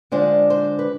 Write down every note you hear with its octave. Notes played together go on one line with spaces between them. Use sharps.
D3 G#3 D4 F4 C5
C5
B4